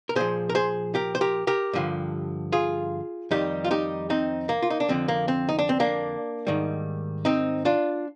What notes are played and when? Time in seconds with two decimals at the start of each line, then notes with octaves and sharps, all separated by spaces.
0.09 A#4
0.16 A#2 F3 G#4 C5
0.49 A#4
0.55 G#4 C5
0.95 G4 A#4
1.15 C5
1.21 G4 A#4
1.47 G4 A#4
1.73 G2 D3 F3
2.52 F4 G#4
3.31 F2 D#3 G3 D#4 G4
3.64 F4
3.71 D#4 G4
4.10 C4 D#4
4.49 A#3
4.62 F4
4.70 D#4
4.80 D4
4.89 F2 D3 F3 C4
5.08 A#3
5.28 C4
5.49 D#4
5.59 D4
5.69 C4
5.80 A#3 D4
6.47 G#2 D#3 G3
7.25 C4 D#4
7.65 D4 F4